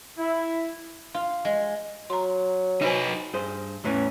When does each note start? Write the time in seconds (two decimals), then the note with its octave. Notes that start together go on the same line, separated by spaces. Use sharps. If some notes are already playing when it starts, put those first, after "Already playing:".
0.18 E4
1.14 F4
1.45 G#3
2.10 F#3 A#5 C6
2.82 D#4 F#4 B4 C5 G#5
3.33 G2 G#4 C5
3.84 E2 A2 E3 C#4